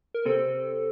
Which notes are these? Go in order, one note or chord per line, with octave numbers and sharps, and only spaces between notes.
A#4
C3 C4 A4